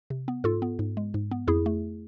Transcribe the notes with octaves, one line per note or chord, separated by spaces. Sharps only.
C3
B3
G#2 F4 A4
B3
G#2
G#3
G#2
B3
F2 E4 G#4
A3